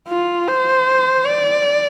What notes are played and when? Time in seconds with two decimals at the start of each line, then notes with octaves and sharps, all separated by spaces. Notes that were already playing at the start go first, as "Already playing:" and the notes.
0.08 F4
0.48 C5
1.26 D5